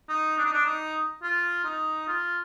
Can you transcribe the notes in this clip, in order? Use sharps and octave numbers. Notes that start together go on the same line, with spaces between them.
D#4
D4
D#4
D4
D#4
F4
D#4
F4